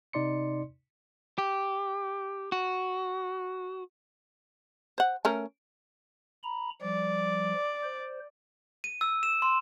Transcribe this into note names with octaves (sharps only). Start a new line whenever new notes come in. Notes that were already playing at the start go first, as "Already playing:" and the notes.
C3 D#4 D5 C6 C#7
G4
F#4
C5 F#5
A3 C#4 A#4
A#5 B5
F3 G3 D5
C5
D#7
E6
E7
C6